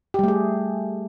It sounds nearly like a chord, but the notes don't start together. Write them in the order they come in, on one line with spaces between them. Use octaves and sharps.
G4 G3 A3 G#4